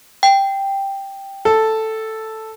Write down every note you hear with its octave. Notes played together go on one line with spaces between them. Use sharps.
G5
A4